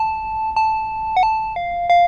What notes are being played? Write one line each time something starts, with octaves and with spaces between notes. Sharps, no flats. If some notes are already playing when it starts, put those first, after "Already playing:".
Already playing: A5
A5
F#5
A5
F5
F5